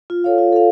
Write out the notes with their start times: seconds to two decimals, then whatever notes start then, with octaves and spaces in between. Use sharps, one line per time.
0.10 F4
0.24 A4 C#5 F5
0.38 F4
0.53 A4 C#5 F5